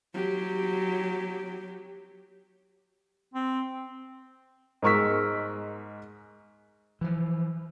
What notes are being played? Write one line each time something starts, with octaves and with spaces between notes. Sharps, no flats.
F#3 G4
C4
G#2 G#3 A#4 C#6 E6 B6
E3 F3